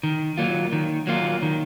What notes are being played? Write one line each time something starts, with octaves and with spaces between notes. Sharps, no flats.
D#3
F#3 A#3 F4
D#3
F#3 A#3 F4
D#3